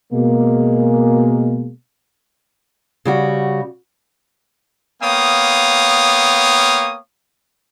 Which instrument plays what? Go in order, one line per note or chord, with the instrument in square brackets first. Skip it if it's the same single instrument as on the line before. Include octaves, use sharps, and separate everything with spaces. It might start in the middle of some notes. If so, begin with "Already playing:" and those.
[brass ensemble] B2 G#3 A#3
[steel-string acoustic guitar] C#3 G3 F#4
[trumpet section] A#3 B3 C#5 F5 G5 D#6